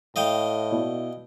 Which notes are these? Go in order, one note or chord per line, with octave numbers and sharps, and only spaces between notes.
A2 D#5 F5 G5
B2 E4 D5